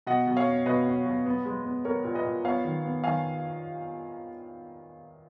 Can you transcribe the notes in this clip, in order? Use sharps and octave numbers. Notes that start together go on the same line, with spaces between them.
B2 D#5 F#5
B2
C#5 F5
C#4
B2 B4 D#5
C#4
B2
B3
G#3
B3
B3 A#4 C#5
A#2
B4 D#5
A#2
B3 C#5 F5
D#3
B3
D#3 F5 G#5